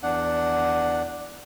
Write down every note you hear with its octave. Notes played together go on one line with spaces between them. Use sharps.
E2 D4 F#5